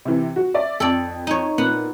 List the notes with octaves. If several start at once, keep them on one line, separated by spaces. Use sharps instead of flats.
C3 E3
F#4
D5 E5
F2 A4 D5
D#4 C#5
A#2 B3 F#5